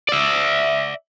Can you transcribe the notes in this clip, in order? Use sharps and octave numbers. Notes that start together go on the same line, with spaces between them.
D5 E5